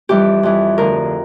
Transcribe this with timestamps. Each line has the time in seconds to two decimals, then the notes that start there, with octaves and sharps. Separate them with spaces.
0.09 F2 E3 G3 G4
0.43 F2 E3 G3
0.78 D2 D3 F3 A#4